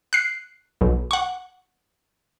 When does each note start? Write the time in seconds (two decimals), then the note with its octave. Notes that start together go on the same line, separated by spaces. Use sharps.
0.13 F#6 C7
0.81 B1
1.11 F#5 C#6